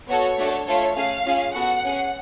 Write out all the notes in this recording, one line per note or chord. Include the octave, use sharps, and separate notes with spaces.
B3 F#4 A4 C#5
A3 D4 F#4 A4
A3 F4 A4 C#5
A3 C#4 G#4 F5
C#4 F4 G#4
B3 F#4 A4 F#5
C#4 G#4